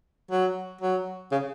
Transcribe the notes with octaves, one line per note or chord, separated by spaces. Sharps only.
F#3
F#3
C#3